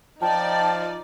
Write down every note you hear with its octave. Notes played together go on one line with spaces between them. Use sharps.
F3 D#4 D5 G5 A5